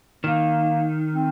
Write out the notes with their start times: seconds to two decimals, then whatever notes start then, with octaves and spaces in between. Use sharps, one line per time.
0.24 D#3 A#3
1.15 C4